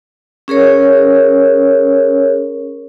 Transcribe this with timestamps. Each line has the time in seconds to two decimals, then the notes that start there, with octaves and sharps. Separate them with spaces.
0.48 C#4 G#4 A#4 C#5